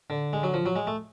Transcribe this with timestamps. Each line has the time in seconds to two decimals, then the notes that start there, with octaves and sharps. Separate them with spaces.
0.10 D3
0.33 G#3
0.43 F#3
0.54 F3
0.66 F#3
0.76 G#3
0.87 A3